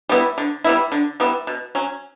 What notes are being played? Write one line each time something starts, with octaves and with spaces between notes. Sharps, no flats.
G3 B3 E4
D3
G3 B3 E4
D3
G3 B3 E4
B2
F#3 C#4